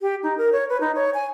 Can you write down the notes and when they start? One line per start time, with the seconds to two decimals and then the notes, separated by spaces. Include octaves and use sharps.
0.01 G4
0.23 D#4
0.38 A#4
0.53 C#5
0.69 B4
0.81 D#4
0.95 C#5
1.14 G#5